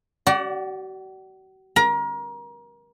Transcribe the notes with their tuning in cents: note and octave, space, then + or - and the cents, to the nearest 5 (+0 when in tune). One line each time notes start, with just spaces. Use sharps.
F#4 +45 D5 +0 F#5 +0
A#4 +30 A#5 +30